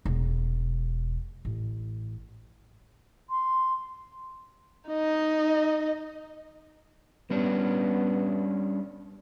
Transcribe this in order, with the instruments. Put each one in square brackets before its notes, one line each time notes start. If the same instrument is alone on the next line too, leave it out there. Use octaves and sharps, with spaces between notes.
[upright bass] E1
A1
[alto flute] C6
[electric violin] D#4 D#5
[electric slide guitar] G3 C#4 D4 [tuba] B3